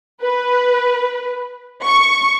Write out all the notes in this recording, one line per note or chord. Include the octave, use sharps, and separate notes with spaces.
B4
C#6